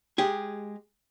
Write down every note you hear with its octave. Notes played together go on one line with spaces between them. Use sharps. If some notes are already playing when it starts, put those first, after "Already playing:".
G#3 G4 G#4